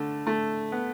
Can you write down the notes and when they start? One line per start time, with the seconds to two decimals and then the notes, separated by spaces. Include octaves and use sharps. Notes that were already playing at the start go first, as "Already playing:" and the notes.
Already playing: D3 A3
0.27 A3
0.72 B3